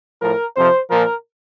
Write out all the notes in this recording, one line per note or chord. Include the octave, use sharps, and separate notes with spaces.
A2 F3 A#4
F2 C3 F3 C5
A#2 F3 A#4